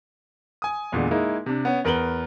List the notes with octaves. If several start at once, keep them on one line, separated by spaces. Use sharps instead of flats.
G#5 D#6
E2 A#2 D3 G#3
G#3 A#3 D#4 E4
C3 D4
B3 C#4
E2 A#4 B4 F#7 G7